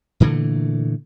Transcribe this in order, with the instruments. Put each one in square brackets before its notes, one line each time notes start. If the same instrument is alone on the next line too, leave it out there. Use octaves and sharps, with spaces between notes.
[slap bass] A#2 D3 E3 A3